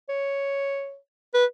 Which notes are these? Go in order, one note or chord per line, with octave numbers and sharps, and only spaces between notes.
C#5
B4